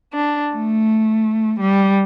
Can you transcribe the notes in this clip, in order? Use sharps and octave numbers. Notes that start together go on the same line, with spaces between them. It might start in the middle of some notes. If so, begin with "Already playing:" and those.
D4
A3
G3